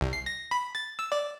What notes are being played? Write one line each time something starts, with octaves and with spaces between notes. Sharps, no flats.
C2
C7
A#6
B5
A6
E6
D5